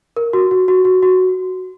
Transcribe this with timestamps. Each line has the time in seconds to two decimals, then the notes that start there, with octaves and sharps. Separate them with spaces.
0.17 A#4
0.33 F#4
0.51 F#4
0.68 F#4
0.85 F#4
1.03 F#4